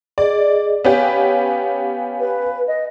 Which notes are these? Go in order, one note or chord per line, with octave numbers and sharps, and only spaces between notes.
G#4 D5 D#5
B3 C#4 G4 F5 G#5
B4
D#5